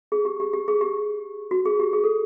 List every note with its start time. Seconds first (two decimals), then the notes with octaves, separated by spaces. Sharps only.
0.12 G#4
0.25 G4
0.40 G4
0.53 G4
0.68 G#4
0.81 G4
1.51 F#4
1.65 G#4
1.80 G4
1.93 G#4
2.04 A4